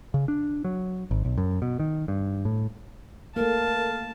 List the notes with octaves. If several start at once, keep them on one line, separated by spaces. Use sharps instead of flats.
C#3
D4
F#3
G#1
B1
F#2
B2
D#3
G2
A2
A3 A#3 A#4 F5 A5